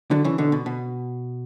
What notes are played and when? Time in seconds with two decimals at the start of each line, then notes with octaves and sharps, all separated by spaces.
0.11 D3 F#3
0.24 C#3 E3
0.38 B2 D3
0.52 B2
0.66 B2